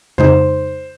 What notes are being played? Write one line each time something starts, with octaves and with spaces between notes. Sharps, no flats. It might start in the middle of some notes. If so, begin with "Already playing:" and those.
F2 C#3 G#3 D#4 C5